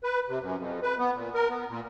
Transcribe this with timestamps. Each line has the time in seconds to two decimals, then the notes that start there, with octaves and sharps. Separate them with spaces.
0.04 B4
0.28 C3
0.41 F#2
0.58 F2
0.83 B4
0.99 B3
1.15 A#2
1.34 A#4
1.50 B3
1.69 A#2